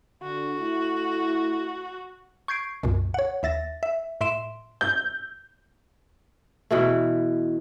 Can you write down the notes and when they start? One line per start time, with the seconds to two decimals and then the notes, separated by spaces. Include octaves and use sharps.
0.22 D3 F#4
0.58 A3 E4
2.48 C#6 G6 G#6 C7 D7
2.83 C2 F#2 A#2
3.14 C#5 F#5
3.43 D#2 E5 A6 A#6
3.83 E5
4.21 A2 E5 C6 D7 E7
4.81 G6
6.71 B2 E3 A3